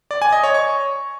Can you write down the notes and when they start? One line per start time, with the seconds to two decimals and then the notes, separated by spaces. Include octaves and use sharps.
0.11 D5
0.22 G#5
0.33 D#5
0.43 C#5
0.54 C#6